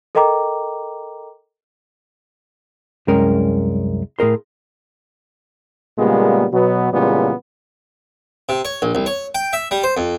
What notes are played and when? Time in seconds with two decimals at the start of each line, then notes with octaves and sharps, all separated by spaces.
0.15 A4 A#4 D#5 G5 A#5 D6
3.08 C2 F#2 G#3 C#4 A#4 G5
4.19 A2 G#4 A#4 C6
5.99 A#2 C#3 G3 G#3 A#3 B3
6.53 B2 F#3 B3
6.93 A#2 C#3 E3 G3 G#3 B3
8.49 C3
8.65 C#5
8.82 A#1
8.95 C2
9.06 C#5
9.35 G5
9.53 E5
9.71 G3
9.83 C5
9.97 F2